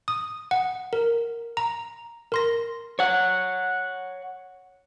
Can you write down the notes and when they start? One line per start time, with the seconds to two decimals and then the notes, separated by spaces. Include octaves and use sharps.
0.08 D#6
0.51 F#5
0.93 A#4
1.57 A#5
2.32 A#4 C6 A#6
2.99 C#5 F#5